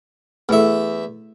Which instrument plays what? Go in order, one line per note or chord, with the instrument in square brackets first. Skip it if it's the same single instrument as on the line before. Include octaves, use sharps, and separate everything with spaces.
[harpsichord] E2 E5 [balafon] A3 E4 A4